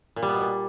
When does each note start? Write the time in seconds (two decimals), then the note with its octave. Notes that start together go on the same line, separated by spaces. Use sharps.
0.16 A#2
0.22 G3
0.29 B3
0.35 B2
0.41 A#2